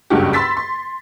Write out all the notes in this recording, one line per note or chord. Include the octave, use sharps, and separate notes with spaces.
F#1 C#2 G2 C#4 F#4 G4
B5 C6 E6 A6 B6
C6